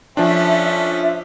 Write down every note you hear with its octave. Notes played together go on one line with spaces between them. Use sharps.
F3 C#4 D4 A4 E5